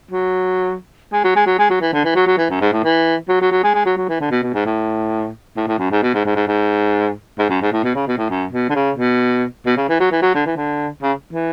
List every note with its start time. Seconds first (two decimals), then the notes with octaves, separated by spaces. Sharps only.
0.11 F#3
1.12 G#3
1.24 F#3
1.36 G#3
1.47 F#3
1.59 G#3
1.70 F#3
1.81 E3
1.93 D3
2.04 E3
2.15 F#3
2.27 F#3
2.38 E3
2.50 F#2
2.61 G#2
2.72 A2
2.84 E3
3.28 F#3
3.41 F#3
3.51 F#3
3.63 G#3
3.74 G#3
3.86 F#3
3.97 F#3
4.09 E3
4.21 D3
4.31 B2
4.43 B2
4.54 G#2
4.66 A2
5.57 A2
5.67 A2
5.79 F#2
5.91 G#2
6.03 B2
6.14 G#2
6.25 G#2
6.36 G#2
6.47 G#2
7.39 G#2
7.49 F#2
7.62 G#2
7.72 A2
7.84 B2
7.95 C#3
8.07 B2
8.18 A2
8.30 F#2
8.52 B2
8.69 D3
8.75 C#3
8.97 B2
9.66 B2
9.77 C#3
9.89 E3
10.00 F#3
10.11 E3
10.22 F#3
10.35 D3
10.46 E3
10.56 D3
11.02 C#3
11.33 E3